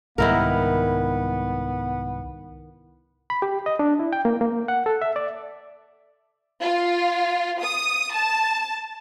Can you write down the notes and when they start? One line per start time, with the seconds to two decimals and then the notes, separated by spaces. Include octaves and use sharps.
0.18 C2 G#2 D#3 G3 B3 E4 A#4
3.30 B5
3.42 G4
3.66 D#5
3.79 D4
4.00 E4
4.13 G5
4.25 A#3
4.41 A#3
4.68 F#5
4.86 A4
5.02 E5
5.16 D5
6.61 F4
7.62 D#6
8.14 A5